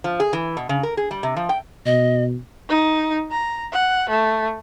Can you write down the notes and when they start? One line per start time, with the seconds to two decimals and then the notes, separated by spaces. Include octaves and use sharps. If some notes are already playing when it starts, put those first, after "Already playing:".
0.04 F3
0.20 G#4
0.33 E3
0.57 B2
0.69 C#3
0.83 A#4
0.97 G#4
1.11 G3
1.23 C3
1.37 F3
1.49 G5
1.86 B2 D#5
2.69 D#4
3.31 A#5
3.72 F#5
4.10 A3